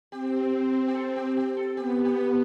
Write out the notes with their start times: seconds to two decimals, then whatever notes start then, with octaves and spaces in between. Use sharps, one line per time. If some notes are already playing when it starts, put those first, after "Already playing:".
0.12 C4 G4
0.87 G4
0.94 A4
1.16 G4
1.37 G4
1.57 A4
1.77 B3 G4
2.05 G4